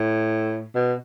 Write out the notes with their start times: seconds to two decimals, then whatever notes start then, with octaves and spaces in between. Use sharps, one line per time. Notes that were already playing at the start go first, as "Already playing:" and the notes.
Already playing: A2
0.75 B2